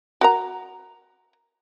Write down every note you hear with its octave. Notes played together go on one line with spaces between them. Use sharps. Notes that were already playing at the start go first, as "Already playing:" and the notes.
F#4 A#4 A#5